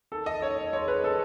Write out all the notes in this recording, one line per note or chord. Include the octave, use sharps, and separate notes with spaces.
D#3 A4
D#5
C#4 C#5
C#5
G#3 C#5
B4
C#4 A4